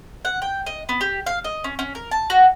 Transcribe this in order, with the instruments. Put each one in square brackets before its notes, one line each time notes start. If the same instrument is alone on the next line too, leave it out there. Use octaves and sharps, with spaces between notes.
[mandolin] F#5
G5
D#5
B3
G4
F5
D#5
C#4
C#4
A#4
A5
F#4